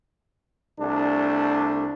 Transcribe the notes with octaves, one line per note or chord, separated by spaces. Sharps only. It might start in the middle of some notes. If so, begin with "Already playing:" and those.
C2 A3 D4